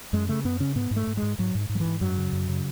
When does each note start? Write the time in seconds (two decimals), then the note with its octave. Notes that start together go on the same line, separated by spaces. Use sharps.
0.13 F#2 G#3
0.29 C#3 A3
0.45 F#2 B3
0.60 C#3 C#4
0.75 G#2 B3
0.91 G#2
0.96 A3
1.07 G#2
1.17 G#3
1.23 G#2
1.39 G#2 F#3
1.55 G#2
1.69 G#2
1.75 F#3
1.80 E3
1.85 G#2
2.01 F#2 F#3
2.18 C#3
2.32 F#2
2.48 C#3